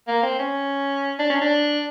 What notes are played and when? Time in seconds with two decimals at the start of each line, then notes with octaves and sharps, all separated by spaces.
0.08 A#3
0.23 C4
0.39 C#4
1.19 D4
1.30 C#4
1.41 D4